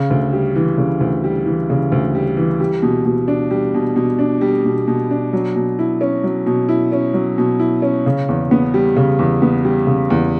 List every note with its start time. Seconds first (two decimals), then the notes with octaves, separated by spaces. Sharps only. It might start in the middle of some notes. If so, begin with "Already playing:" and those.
Already playing: C#3
0.10 D2
0.33 G3
0.56 E3
0.78 C#3
1.00 D2
1.24 G3
1.46 E3
1.70 C#3
1.92 D2
2.15 G3
2.37 E3
2.60 G3
2.82 B2
3.05 B2
3.28 D4
3.51 G3
3.74 B2
3.96 B2
4.19 D4
4.41 G3
4.65 B2
4.87 B2
5.11 D4
5.33 F#3
5.56 B2
5.79 E4
6.01 C#4
6.24 F#3
6.46 B2
6.69 E4
6.92 C#4
7.14 F#3
7.38 B2
7.59 E4
7.82 C#4
8.06 C#3
8.29 E2
8.51 B3
8.74 G3
8.96 C#3
9.19 E2
9.42 B3
9.65 G3
9.87 C#3
10.10 E2